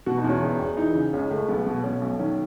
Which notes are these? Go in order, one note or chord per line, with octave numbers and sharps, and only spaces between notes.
B2 F#4
D#4
E2
C#4
E1
E1
E3 D#4
C#3
C#2 C#4
C#2 A3
B1 B3
B2
B2 C#4
B1
D#3 C#4